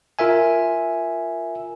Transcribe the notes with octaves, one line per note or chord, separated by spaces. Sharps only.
F4 A#4 E5 G#5